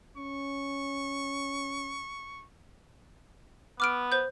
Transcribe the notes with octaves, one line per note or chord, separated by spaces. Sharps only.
C#4 C#6
B3 D6 F6 D7
C5 G6